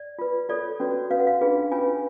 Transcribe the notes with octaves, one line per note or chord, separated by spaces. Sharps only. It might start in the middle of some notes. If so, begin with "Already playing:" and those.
Already playing: D5
F4 B4
F4 A4 C#5 D5
C#4 F#4 B4
C#4 F#4 B4 F5
F#5
F5
D4 F4 G#4 B4
C#4 F4 B4 G#5